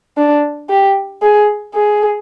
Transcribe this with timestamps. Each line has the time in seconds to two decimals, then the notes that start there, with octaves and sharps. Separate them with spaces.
0.17 D4
0.69 G4
1.22 G#4
1.74 G#4